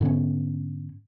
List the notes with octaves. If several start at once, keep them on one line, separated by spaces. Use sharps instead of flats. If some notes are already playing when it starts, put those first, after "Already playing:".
G#2 D3 B3 C#4